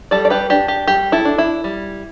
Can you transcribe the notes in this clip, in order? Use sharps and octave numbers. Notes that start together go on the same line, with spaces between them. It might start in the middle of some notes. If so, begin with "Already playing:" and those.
G3 A4 D5
D5
G4 B4
D4 G4
G4
G3 G4
E4 A4
D4
E4
G3